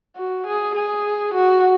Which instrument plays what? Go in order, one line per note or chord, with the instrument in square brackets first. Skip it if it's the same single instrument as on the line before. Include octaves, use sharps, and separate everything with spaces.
[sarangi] F#4
G#4
G#4
F#4